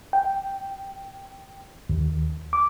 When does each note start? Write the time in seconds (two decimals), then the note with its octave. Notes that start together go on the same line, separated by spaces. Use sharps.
0.13 G5
1.90 D#2
2.53 D6